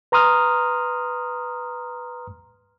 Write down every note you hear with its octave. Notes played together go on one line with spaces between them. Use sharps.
B4 A#5 C6 D#6 F6